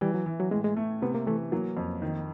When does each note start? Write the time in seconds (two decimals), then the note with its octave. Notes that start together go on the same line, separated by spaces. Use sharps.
0.01 E3 G3
0.14 F#3
0.26 E3
0.40 F#3
0.51 A2 G#3
0.64 G#3
0.77 A3
1.02 C3 B3
1.15 A#3
1.26 E3 A3
1.52 F#3 A#3
1.77 F2
2.02 D#3